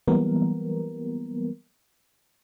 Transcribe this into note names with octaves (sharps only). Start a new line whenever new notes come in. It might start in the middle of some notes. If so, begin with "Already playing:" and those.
E3 F#3 G3 A#3 B3 A#4